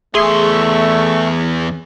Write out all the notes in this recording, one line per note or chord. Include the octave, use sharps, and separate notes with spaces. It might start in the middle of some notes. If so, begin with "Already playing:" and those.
E2 A3 G#4 E5 C6 C#6